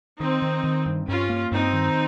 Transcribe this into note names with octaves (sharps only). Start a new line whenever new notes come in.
D#3 C4 D#4
D#3
D#3
G2
G2 C#4 F4
A#3
G2 C4 D#4
D#3